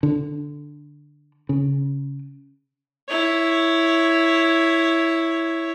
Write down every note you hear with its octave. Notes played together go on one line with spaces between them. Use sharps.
D3
C#3
E4 C#5